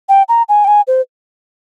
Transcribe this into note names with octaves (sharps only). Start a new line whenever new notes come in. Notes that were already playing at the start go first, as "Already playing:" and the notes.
G5
A#5
G#5
G5
G#5
C5